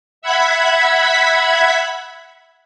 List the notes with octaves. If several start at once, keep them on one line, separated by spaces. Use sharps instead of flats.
E5 F#5 B5 G#6 B6